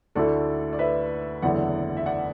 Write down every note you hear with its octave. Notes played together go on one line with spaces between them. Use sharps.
D2 D3 A3 E4 A4 D5
D5
B4 E5
F#1 E2 D3 A3 E4 D5 F#5
E5
D5 F#5